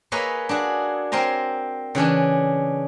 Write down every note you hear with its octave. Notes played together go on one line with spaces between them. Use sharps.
A#3 G#4 B4 C#5 D#5 E5
D4 F#4 G#4
C4 A#4 C5 G#5 A#5
C#3 E3 C#4 D4